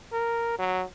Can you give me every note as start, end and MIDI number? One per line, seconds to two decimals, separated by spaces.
0.12 0.56 70
0.59 0.84 54